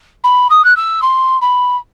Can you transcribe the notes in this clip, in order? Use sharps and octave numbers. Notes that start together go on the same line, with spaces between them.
B5
D#6
F#6
E6
C6
B5